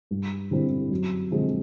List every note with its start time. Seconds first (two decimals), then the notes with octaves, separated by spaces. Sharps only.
0.11 G2
0.51 D3 G3 C4 E4
0.91 F#2
1.31 D3 F3 G#3 C4